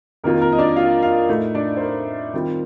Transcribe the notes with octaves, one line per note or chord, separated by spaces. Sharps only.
F2 D#3 A#3 F4 A#4
A#4
D#5
D4 D5
F4 F5
F4 F5
A2 A3 D#4
D4 D5
C5
A#4
D#3 G3 C4 F4